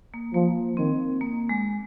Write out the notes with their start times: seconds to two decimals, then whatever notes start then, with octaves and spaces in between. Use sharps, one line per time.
0.14 A#3
0.34 F3 A#3
0.77 D#3 C4
1.21 A#3
1.49 G#3